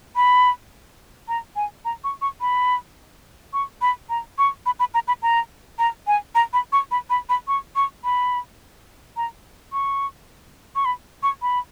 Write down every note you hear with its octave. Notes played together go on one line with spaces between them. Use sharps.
B5
A#5
G#5
A#5
C#6
C#6
B5
C#6
B5
A#5
C#6
B5
B5
A#5
B5
A#5
A#5
G#5
A#5
B5
C#6
B5
B5
B5
C#6
C#6
B5
A#5
C#6
C#6
B5
C#6
B5